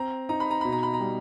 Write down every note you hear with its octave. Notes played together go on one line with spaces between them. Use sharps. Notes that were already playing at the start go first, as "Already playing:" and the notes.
Already playing: C4 A#5
D#4 A#5
B5
A#5
B2 B5
A#5
B5
A#5
G3